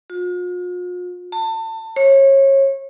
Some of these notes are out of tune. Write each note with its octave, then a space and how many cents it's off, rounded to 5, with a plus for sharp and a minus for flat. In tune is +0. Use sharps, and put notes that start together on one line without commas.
F4 +45
A5 +30
C#5 -30